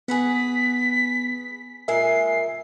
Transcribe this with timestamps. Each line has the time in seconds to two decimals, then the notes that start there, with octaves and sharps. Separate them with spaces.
0.08 B3 G#4 B4 F#5 B6
1.88 A#2 G#3 A#4 E5 G#5 C7